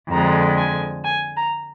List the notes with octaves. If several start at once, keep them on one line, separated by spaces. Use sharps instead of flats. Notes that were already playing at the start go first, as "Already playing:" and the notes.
F2 D3 G#3 A#5
G#5
G#5
A#5